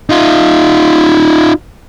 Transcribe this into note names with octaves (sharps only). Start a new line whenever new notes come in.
D#4 F4